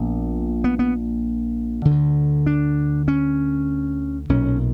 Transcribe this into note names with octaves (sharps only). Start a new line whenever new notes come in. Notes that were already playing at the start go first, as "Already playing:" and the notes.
Already playing: A#1 A#2 B3
B3
B3
D3
D2
D4
C#4
B1 A#2 C#4